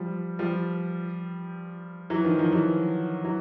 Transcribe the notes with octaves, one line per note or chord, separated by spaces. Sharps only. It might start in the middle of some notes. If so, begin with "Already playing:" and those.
Already playing: F3 G3
F3 G3
E3 F#3
D#3 F3
D#3 F3
E3 F#3
E3 F#3